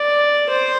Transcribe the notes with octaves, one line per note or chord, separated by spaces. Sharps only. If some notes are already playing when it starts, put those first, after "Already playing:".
Already playing: D5
C5